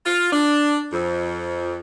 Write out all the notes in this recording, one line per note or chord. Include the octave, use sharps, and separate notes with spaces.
F4
D4
F2